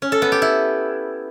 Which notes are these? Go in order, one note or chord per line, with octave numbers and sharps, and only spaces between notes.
C#4
A4
B3
G4
E4